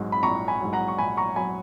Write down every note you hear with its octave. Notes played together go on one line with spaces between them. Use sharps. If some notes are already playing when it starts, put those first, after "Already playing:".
Already playing: A#1 G#2 F#3
B5
A#1 A#5 C#6
G#5 B5
G#2 F#3
F#5 A#5
C#6
A#1 G#5 B5
A#5 C#6
F#3 G#5 B5